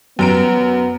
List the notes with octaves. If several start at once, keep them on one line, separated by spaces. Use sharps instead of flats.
F#2 B3 A#5 D7